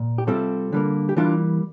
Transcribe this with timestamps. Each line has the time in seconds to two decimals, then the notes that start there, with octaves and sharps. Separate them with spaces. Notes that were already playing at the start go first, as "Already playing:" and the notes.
Already playing: A#2
0.18 G4
0.27 C3 G3 C4 F4 A4
0.73 D3 G3 A#3
1.09 G4
1.16 E3 G3 A#3 D4 F4